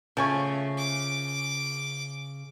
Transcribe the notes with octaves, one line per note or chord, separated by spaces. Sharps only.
C#3 F3 A3 G#5 C#6
D6